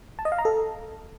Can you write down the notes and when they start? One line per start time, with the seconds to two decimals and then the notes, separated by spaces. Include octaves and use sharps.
0.19 A5
0.25 D#5
0.32 F5
0.38 A#5
0.45 A4